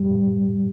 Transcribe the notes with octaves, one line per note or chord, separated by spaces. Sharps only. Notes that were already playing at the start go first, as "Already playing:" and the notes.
Already playing: G3